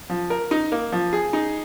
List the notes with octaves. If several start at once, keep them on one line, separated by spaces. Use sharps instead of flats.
F3
A#4
D#4
A#3
F3
G#4
D#4